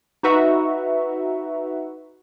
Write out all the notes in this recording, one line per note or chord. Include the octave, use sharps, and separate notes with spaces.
D#4 F#4 B4 E5 F#5 A#5